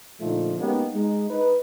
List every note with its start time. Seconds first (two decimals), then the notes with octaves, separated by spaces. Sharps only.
0.20 A#2 D3 F3 A3 D#4
0.59 G#3 A#3 B3 C#4 D#4 G4
0.94 G#3 D#4
1.30 D#4 B4